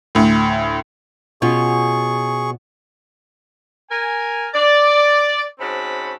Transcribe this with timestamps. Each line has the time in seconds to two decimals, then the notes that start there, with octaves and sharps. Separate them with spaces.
0.15 D2 A2
1.42 B2 C#4 F4 G#4 C#6
3.91 A#4 G#5
4.54 D5
5.60 G#2 C4 C#4 F#4 A5 B5